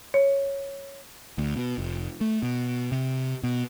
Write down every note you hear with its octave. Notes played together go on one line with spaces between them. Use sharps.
C#5
D2
B2
F1
A3
B2
C3
B2